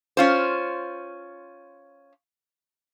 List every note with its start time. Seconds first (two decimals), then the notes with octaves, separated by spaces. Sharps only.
0.17 C#4 F4 C5